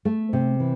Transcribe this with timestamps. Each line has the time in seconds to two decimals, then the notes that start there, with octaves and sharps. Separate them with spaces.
0.05 A3
0.33 C3
0.60 E3